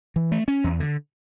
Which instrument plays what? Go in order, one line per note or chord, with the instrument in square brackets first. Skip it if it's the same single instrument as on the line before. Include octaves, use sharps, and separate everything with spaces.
[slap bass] E3
A3
C#4
E2
D3